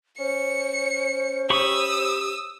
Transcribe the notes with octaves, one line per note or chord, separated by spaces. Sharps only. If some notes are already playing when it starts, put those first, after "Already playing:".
C#4 C5 C#7
G4 B5 C#6 D#6 E6